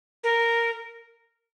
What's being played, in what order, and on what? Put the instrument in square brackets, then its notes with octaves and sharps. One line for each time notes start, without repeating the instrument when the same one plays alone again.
[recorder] A#4